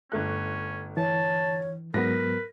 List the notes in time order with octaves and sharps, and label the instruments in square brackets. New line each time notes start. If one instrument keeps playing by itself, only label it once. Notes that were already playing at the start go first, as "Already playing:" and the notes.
[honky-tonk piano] G1 A3 F#6 [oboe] C#4
[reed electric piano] E3 [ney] C#5 [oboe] A5
[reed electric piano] G#2 F#3 B3 [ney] A#4 [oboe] B4 [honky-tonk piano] A#6